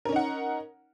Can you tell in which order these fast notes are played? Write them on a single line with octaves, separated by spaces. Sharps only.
A#4 C#4 D#4 F#5